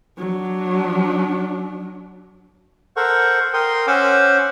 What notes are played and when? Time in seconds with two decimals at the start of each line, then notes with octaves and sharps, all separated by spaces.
0.18 F#3 D4
2.97 A4 A#4 C5 F#5 C#6
3.54 A#4 G5 C6 D#6
3.87 C#4 C5 F#5 G#5 D6 E6